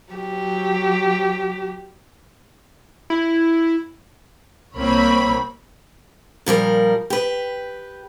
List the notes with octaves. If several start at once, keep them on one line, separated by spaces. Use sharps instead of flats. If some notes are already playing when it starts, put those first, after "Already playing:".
F#3 G4
E4
C2 A#3 C4 C#5 B5
A#2 F3 G3 A#4
G4 B4